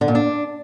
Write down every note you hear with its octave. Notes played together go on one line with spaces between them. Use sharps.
D3
A#2
D4